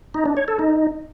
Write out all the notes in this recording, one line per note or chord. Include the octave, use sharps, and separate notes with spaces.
D#4
D4
C#5
A4
D#4